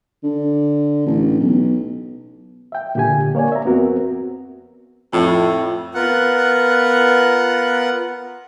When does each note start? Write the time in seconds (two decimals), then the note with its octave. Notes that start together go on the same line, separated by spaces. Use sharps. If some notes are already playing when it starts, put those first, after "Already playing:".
0.23 D3
1.06 A1
1.40 B1
2.72 E5 G5
2.95 A#2 D3 G4 G#5
3.35 A#3 C#5 D5 G#5
3.52 E5 A#5
3.65 F2 B3 C4 F#4 A#4
5.13 F2 A2
5.95 B3 F4 A#4 F#5 F#6